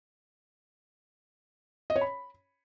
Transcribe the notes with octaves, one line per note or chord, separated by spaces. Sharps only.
D#5
C#5
B5